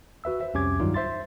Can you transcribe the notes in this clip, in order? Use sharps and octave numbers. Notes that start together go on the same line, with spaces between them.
F#4 B4 E5 E6
C5 E5
C2 F2 C#4 G4 D6 G#6
G2 D#3 F#3 G3 D#4 F4
C5 E5 C6 A6